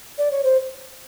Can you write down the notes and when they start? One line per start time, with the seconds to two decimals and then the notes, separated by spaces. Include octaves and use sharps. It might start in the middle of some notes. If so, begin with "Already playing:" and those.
0.18 D5
0.31 C#5
0.44 C5